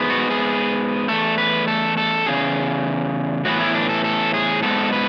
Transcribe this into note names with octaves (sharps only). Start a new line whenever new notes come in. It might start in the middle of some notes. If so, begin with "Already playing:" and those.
Already playing: G#2 G#3 B3
F#4
G#4
E2 B2 A3 A4
B4
A4
A4
E2 C#3 G#4
A2 E3 B3 F#4
E4
D4
A4
A4
G#4
G#2 G#3 B3 A4
B4